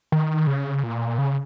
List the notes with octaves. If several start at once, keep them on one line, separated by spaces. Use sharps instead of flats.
D#3
C#3
A#2
C#3